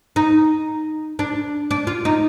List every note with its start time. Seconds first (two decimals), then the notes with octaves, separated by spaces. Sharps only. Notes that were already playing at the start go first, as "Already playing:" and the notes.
0.16 D#4
1.19 D4
1.71 D4
1.87 F4
2.05 D#4